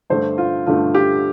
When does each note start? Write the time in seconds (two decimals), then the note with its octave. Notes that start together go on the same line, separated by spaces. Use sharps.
0.10 G2 D3 A3 C5
0.38 F4
0.66 G2 D3 A3 F4
0.95 G4